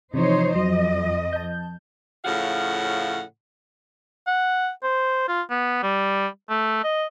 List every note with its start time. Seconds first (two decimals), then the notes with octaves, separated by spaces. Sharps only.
0.14 C3 E3 F3 D#4 C5 C#5
0.55 F2 F#3 D#5
1.33 A5 G6
2.25 A2 C#3 F3 F5 F#5
4.27 F#5
4.83 C5
5.28 F4
5.50 B3
5.83 G3
6.50 A3
6.84 D#5